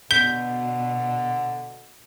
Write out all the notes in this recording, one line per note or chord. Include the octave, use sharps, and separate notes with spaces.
B2 D3 G6 B6 G7